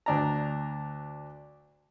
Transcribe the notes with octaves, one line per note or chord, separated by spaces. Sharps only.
D2 D4 A#5